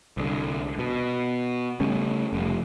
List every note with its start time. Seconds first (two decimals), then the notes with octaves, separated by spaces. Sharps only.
0.17 C2 D3
0.79 B2
1.80 C#3 G3 A3 C#4
2.33 F1